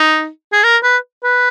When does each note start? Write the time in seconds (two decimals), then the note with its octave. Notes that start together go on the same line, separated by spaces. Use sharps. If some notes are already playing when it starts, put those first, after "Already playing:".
Already playing: D#4
0.52 G#4
0.64 A#4
0.83 B4
1.24 B4